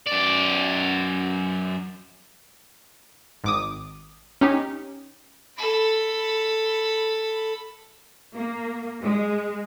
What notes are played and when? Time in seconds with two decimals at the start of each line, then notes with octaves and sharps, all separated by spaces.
0.07 F#2 D5
3.44 G#1 D6 D#6
4.41 C#4 D#4 G4
5.57 A4 B5
8.35 A#3
9.03 G#3